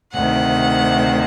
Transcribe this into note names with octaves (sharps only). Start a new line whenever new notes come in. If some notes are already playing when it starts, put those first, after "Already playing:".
D2 C3 D#3 F#5